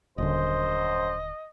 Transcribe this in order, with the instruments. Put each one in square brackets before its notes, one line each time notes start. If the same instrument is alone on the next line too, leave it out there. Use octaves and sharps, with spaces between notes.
[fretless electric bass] D#1 D3 [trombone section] F#2 C5 [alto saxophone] D#5